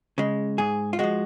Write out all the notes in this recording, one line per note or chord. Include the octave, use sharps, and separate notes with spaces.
C#3 G#3
G#2 G#4
F4
F3 G#3 F#4